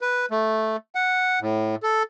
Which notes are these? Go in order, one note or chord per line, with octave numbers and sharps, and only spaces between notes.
B4
A3
F#5
A2
A4